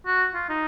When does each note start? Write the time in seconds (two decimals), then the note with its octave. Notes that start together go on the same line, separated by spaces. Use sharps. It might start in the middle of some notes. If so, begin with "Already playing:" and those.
0.06 F#4
0.34 F4
0.49 D#4